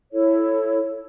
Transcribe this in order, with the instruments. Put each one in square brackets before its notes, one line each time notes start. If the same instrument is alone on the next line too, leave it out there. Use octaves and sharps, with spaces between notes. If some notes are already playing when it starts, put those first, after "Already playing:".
[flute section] E4 A4 C#5